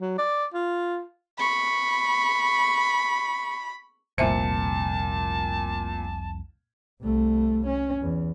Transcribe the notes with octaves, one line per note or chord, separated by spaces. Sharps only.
F#3
D5
F4
B5 C#6
F1 C2 A#2 C5 E5 G#5 A5 C#7
C2 A3
C#4
E2